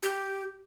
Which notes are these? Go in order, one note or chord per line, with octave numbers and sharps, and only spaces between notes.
G4